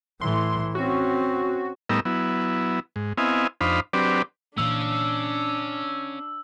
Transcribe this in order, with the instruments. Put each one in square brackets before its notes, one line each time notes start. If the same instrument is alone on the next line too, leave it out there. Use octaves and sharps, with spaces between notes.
[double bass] A2 E3 [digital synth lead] C6
[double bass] C4 C#4 [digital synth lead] F#4
[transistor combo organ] A2 G3 B3 D#4 A#4 E6
F#3 B3 E4
G#2
B3 C4 E4 D#5 F5 G#5
F2 D4 D#4 C5 F5 B5
F#3 C4 D4 G4 B4 D5
[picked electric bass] A#2 E3 A#3 [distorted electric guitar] C#4 F5 [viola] D4 [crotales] E6